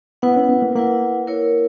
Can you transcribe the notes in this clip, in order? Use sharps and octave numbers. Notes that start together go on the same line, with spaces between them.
B3 E4 B4 F#5
C#4
B3
A#3
A#3 E4 B4 F#5
E4 A#4 C#5